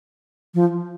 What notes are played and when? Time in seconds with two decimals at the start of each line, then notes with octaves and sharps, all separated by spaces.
0.54 F3